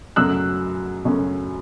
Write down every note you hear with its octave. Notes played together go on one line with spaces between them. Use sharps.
F#2 C#3 F#3 A3 C#4 E6 F#6
F#2 C#3 F#3 A3 C#4